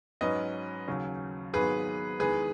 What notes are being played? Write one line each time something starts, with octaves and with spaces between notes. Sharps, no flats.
G#2 F#3 C#4 B4 D#5
D#2 C#3 F#3 C#4
G#1 G#2 D#3 F#3 B3 G#4 B4
E2 D#3 G#3 G#4 B4